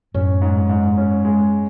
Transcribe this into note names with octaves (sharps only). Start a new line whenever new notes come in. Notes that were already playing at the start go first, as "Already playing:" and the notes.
F#2 A2 C#4
G#2
G#2
C#4
G#3